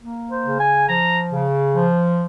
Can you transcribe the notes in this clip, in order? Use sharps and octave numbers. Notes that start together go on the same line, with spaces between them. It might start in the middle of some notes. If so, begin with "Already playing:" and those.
A#3
C5
C#3
G#5
F3 A#5
C#3
F3